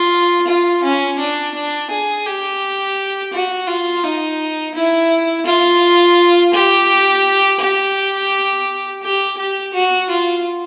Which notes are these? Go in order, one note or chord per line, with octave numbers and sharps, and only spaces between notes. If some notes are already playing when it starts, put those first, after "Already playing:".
Already playing: F4
F4
C#4
D4
D4
G#4
G4
F#4
F4
D#4
E4
F4
G4
G4
G4
G4
F#4
F4